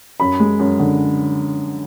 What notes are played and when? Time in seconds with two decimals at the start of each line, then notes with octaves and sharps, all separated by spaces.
0.20 F#2 B5
0.40 G#3
0.59 F#2
0.80 D3